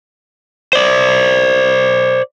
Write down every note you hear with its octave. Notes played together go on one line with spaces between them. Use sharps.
C5 D5